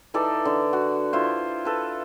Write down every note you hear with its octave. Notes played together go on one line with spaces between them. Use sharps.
E3 D#4 A4 D5
D3
F#4
E4 F4 C5
A4 B4